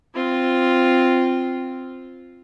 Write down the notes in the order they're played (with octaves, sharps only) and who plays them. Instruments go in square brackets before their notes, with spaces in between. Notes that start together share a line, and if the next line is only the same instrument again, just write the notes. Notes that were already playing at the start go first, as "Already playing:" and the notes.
[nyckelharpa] C4 F4